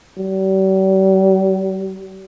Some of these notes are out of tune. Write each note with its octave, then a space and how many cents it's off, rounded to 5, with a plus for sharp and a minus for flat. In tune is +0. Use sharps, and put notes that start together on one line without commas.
G3 -45